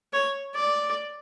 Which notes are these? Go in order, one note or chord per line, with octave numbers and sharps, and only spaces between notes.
C#5
D5